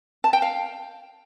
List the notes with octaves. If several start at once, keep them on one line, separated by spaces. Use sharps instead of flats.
A5
G5
F5